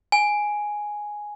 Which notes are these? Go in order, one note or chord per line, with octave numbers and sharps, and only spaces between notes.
G#5